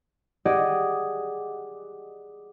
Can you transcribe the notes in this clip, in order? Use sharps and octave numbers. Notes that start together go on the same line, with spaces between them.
G4 G#4 D5 D#5 F#5